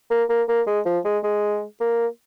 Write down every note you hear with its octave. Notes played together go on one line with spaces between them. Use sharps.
A#3
A#3
A#3
G#3
F3
G#3
G#3
A#3